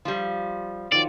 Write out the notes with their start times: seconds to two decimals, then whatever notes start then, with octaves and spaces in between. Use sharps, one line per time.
0.05 F3 G3 F4
0.92 D#3 F3 F#3 D5